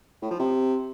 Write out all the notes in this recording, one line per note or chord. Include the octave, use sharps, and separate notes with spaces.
A2
F3
C3